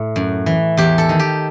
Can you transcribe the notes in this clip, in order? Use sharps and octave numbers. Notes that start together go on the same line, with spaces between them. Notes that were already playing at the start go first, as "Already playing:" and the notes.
Already playing: A2
F#2
E3
E2 G4
A4
D#3
G4